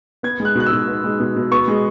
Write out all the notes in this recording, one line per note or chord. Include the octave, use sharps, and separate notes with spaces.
B3 G#6
G#3
F#6
B2 F#6
E6
B2
B3
G#3
B2
B2
B3 C#6
G#3